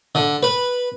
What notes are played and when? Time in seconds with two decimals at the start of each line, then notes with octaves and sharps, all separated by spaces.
0.15 D3
0.43 B4